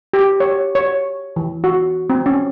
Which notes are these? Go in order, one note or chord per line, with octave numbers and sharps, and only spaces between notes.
G4
C#5
C#5
E3
F#4
C4
C#4